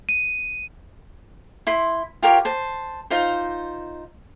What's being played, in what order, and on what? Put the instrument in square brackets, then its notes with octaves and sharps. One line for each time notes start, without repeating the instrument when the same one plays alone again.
[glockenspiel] D#7
[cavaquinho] E4 C6
F4 G4 A#4 C#5
C5 A5
D#4 F4 C5